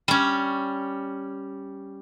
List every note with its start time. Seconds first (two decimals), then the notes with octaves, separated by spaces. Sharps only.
0.08 G3 C#4